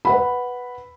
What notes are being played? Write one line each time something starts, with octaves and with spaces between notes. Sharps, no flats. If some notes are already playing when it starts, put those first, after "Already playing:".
B4 F#5 B5